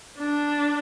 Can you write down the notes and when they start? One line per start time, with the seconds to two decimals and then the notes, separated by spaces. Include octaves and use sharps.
0.18 D4